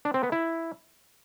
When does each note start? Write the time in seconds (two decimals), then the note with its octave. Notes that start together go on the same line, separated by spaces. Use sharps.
0.05 D4
0.14 C4
0.23 B3
0.32 E4